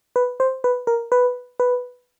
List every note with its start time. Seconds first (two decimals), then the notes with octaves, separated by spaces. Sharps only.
0.16 B4
0.40 C5
0.64 B4
0.87 A#4
1.12 B4
1.60 B4